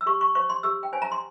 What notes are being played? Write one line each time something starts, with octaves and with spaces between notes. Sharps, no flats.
E6
G4 C#6
C#6
C5 C#6
C6
G4 E6
G5
C5 G#5
A#5
C6